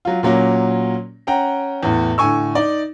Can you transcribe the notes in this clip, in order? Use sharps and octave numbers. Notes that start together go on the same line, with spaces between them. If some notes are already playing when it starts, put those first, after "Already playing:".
F#3 F4
A#2 F#3 A#3 C#4
C#4 F#5 G5 A#5
E2 A2
A2 D3 G#5 C#6 E6
D#4 D5